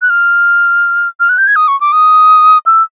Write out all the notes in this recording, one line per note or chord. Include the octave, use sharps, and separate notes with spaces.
F#6
F6
F6
F#6
G6
G#6
D#6
C#6
D6
D#6
E6